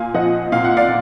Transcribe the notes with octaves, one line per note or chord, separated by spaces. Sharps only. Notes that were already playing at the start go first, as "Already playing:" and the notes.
Already playing: A#2 F5 G#5
F3 D#5 F#5
A#2 F5
F#5
D5 F5